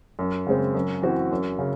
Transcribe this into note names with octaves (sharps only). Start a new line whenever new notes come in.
F#2
C#3 G#3 C4
F#2
E3 C4 F#4
F#2
C#3